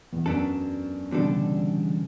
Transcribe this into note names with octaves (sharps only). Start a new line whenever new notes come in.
E2
F#2 F#3 B3 D4 A4
E2 B2 D3 G3 D4 A4
C#3